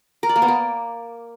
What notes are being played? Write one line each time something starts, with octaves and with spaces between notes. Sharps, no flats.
A#4
D5
A#3
B3
A#3